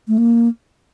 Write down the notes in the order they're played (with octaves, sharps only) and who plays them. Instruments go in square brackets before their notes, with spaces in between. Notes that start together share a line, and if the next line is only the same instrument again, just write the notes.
[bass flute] A3
A#3